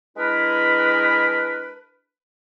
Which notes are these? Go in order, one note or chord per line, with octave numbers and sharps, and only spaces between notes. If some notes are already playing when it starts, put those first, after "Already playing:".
G#3 D4 E4 A#4 B4